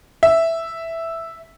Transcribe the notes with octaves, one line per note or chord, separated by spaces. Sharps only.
E5